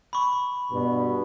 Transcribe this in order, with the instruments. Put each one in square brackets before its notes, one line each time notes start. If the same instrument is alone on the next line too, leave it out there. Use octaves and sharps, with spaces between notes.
[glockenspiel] B5 C#6
[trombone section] G2 B2